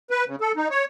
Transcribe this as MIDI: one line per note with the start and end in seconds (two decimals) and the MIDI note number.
0.10 0.25 71
0.27 0.36 49
0.41 0.52 69
0.56 0.68 63
0.70 0.85 73